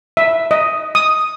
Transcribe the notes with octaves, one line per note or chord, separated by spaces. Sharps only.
E5
D#5
D#6